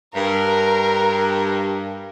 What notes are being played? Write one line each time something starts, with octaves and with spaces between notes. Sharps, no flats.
G2 A#4